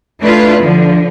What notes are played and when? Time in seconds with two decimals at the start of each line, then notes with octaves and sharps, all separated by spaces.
0.21 A3 D4 E4 F4 B4
0.60 D3 F3